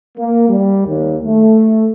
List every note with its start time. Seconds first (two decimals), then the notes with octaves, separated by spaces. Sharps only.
0.18 A#3
0.49 G3
0.87 D#2
1.23 A3